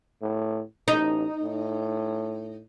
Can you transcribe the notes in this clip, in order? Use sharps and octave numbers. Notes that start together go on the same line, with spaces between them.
A2
A1 D#4
A2